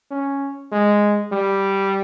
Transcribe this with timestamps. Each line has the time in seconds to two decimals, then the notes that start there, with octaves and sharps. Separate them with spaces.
0.11 C#4
0.72 G#3
1.32 G3